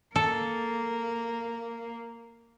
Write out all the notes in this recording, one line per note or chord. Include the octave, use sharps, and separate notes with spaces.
A#3 A4